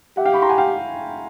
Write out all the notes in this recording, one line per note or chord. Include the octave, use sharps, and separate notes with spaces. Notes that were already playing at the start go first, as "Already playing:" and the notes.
G4 E5 F#5
F5 G5
B5 C#6
A#5 C6
F#5 G#5
F5 G5